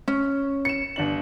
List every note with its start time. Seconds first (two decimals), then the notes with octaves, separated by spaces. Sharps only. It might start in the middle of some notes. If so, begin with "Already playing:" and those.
0.08 C#4
0.65 C#7 E7
0.96 G1 D4 F#7